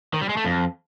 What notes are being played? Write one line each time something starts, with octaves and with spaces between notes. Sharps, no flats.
D#3
G3
G#3
A3
F2